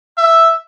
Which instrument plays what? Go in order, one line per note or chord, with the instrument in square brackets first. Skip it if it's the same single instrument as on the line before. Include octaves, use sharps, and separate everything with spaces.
[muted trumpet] E5